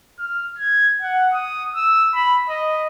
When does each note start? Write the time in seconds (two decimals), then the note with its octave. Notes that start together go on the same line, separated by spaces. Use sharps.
0.19 F6
0.58 G#6
1.02 F#5
1.34 D#6
1.76 E6
2.14 B5
2.49 D#5